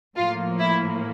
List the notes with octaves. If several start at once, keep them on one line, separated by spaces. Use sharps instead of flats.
A2 F3 A#3 F4
E4